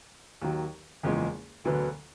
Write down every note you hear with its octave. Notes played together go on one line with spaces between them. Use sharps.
D#2 D#3 F#3
F#1 E2 C#3 F3 G#3
E1 D2 D3 F#3 B3